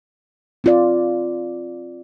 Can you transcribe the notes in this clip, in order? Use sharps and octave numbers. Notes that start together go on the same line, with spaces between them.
C4 F4 D5